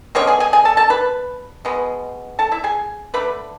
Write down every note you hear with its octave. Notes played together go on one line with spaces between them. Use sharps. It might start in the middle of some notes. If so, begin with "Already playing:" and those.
D3 G#3 B3 C#4 C#5
G#4 G#5
G#4 G#5
G#4 G#5
A4 A5
A4 A5
B4 B5
B2 G#3 B3
A4 A5
E4 E5
G#4 G#5
D3 A3 B4 B5